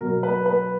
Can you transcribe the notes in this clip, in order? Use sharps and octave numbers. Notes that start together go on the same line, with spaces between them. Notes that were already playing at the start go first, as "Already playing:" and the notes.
B2 F#3 A#4
B4
B4